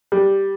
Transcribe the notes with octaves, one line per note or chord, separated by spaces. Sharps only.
G3